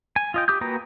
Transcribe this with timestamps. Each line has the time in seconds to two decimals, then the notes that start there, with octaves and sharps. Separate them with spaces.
0.16 G#5
0.34 F4 D#5 G5
0.48 G4 D6 D#6 G6
0.61 A#3 F#4 B4 G5 A#5